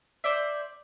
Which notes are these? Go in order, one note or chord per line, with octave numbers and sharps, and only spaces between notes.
C5 D5 E5